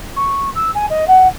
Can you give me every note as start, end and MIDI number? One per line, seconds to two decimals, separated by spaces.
0.17 0.50 85
0.55 0.71 88
0.75 0.86 80
0.90 1.08 75
1.08 1.28 78